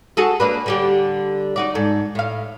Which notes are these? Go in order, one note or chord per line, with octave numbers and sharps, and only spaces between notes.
F#4 G#4 A4
A#3 D4 B4
D3 G3 G4
D#4 F#4 D5
G#2 A4
A2 F5